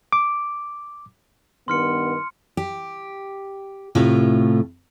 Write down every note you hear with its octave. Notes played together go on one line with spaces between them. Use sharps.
D6
G2 D#3 B3 C6 F6 C#7
G4
A2 C3 A3 F4